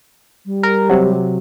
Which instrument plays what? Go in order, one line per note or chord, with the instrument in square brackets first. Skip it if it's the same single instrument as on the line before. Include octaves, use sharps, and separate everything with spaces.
[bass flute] G3
[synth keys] A#4
C3 F#3